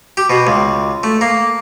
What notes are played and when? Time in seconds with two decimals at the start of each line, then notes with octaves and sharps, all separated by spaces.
0.17 G4
0.30 B2
0.47 C#2
1.03 A3
1.21 A#3